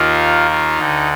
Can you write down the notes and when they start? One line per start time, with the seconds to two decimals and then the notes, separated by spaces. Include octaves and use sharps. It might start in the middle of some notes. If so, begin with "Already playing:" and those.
Already playing: D#2 D#3 F4
0.51 F4
0.78 D2 D3 D#4